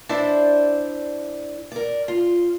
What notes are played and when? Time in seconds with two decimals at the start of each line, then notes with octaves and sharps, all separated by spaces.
0.09 D4 E4 C5 D5
1.72 A#4 D5
2.08 F4